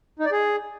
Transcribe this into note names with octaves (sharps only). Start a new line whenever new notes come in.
D#4
D5
G#4